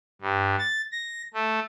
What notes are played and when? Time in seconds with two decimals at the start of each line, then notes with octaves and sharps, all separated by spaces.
0.22 G2
0.59 A6
0.92 A#6
1.34 A3